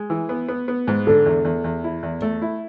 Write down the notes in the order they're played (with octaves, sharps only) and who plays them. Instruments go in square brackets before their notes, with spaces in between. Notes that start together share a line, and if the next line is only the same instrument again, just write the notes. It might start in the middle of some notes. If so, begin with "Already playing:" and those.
Already playing: [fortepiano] G#3
E3
B3
B3
B3
G#2
[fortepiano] D3 [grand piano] A4
[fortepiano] E2
E2
E2
E4
E2
A3
E4